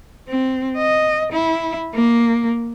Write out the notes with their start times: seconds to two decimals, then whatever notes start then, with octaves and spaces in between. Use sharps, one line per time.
0.28 C4
0.78 D#5
1.33 E4
1.94 A#3